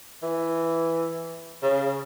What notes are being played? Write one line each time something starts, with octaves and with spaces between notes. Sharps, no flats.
E3
C#3